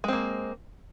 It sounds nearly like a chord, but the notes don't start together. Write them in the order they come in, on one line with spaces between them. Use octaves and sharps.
G#3 C4 A#3